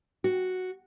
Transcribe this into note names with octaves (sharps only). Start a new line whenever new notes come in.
F#4